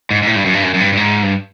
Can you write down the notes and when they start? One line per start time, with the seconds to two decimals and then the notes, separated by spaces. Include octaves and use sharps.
0.11 G#2
0.23 G#2
0.27 A2
0.36 G2
0.45 F#2
0.54 G2
0.63 F#2
0.74 F#2
0.80 G2
0.93 G2
0.97 G#2
1.23 G2